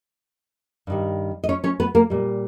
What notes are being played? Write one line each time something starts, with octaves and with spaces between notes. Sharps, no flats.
G2 D#3 G3
D#5
C#4 C#5
C#4 C#5
B3 B4
A#3 A#4
A#2 G3